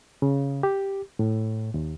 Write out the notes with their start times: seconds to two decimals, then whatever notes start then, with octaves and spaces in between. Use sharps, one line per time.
0.22 C#3
0.63 G4
1.19 A2
1.74 D#2